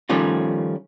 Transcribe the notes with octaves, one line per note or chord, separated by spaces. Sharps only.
D#3 F3 G3 A3 C#4 F4